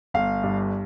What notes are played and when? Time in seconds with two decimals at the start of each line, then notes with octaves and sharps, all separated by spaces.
0.14 G1 F5
0.43 G2